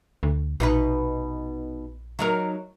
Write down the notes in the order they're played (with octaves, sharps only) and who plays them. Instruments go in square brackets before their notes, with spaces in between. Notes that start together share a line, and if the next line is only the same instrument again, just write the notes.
[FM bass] D2
[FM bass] A#1 [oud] B2 D#4 B4
[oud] F#3 D#4 A#4